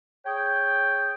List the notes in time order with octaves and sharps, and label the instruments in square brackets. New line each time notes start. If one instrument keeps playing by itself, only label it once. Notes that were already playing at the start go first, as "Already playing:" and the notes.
[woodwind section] G#4 C#5 G5